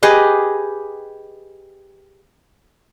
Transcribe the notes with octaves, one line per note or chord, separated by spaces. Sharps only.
G4 G#4 B4 D#5